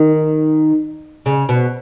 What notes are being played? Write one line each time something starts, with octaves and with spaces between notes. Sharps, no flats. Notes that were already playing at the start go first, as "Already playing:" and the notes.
Already playing: D#3
C#3
B2